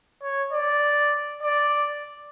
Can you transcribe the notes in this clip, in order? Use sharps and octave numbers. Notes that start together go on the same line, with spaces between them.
C#5
D5
D5